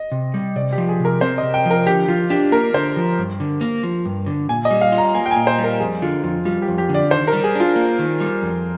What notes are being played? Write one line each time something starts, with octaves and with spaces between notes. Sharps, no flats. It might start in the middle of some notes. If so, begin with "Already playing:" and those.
Already playing: D#5
C3
G3
C3 D5
G4
F3
G#4
C3 A#4
C4 C5
D#5
C3
G5
F3
A#4
D3 G4
F3 F4
D4 G4
A#3 A#4
D3 C5
F3
G2
D3
A#3
F3
G2
D3
A#2 G#5
D#5
G3
F5
F4
A#5
A#3 G#5
G5
A#2 G#5
C5
G3
A#4
F2 G#4
D3 F4
F2 F4
G3 F4
G4
F2
G4
D3
D5
D#3 C5
A#4
G3
G#4
D4 F4
A#3
D#3
G3
F2